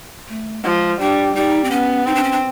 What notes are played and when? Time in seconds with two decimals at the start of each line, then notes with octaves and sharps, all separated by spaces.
0.28 A3
0.63 F3 G#3
1.00 G3 D4
1.35 G3 D#4
1.64 C4
1.70 B3 C#4
2.06 C4 D#4
2.15 D4
2.23 C#4
2.32 D4